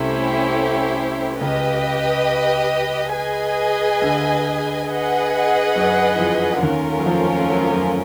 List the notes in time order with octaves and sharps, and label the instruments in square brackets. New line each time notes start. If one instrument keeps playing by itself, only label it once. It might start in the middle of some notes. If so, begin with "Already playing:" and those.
Already playing: [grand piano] C2 C3 [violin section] A3 C#4 E4 G4 C5
[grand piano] C#2 C#3 [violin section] G4 B4 D#5
[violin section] G#4 B4 D#5 G#5
[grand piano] D2 D3
[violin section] G#4 B4 D#5 F#5
[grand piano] F#2 F#3
E3
F2 F3
D3
[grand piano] D#2 D#3 [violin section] A3 C#4 F4 A#4
[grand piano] F#3
F2 F3
F#3
F3
F#2 F#3